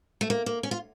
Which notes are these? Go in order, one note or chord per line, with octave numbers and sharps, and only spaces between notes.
A3
A#3
A#3
C#4
F4